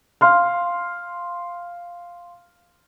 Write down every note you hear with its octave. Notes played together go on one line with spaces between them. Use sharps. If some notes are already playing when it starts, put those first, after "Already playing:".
F5 C6 F6